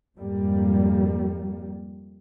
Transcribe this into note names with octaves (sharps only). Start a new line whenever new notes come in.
F2 G#2 G3 A#3